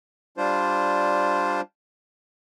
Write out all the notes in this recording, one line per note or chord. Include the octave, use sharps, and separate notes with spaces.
G3 D4 F4 C5